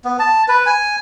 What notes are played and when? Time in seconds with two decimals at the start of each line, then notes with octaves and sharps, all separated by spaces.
0.05 B3
0.19 A5
0.48 B4
0.66 G#5